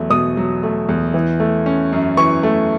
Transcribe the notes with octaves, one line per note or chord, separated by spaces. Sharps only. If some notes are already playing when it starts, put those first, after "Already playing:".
Already playing: E2 F#3 A3
B2 D#6
F#3
A3
E2
E3
A3
C#4
F#2
E3 C#6
A3